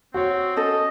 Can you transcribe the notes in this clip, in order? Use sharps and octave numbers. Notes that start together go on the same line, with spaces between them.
C4 F#4 C#5
C#4 A4 D#5